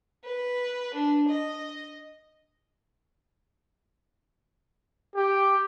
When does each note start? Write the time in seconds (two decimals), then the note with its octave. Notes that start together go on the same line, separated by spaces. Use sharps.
0.24 B4
0.94 D4
1.28 D#5
5.16 G4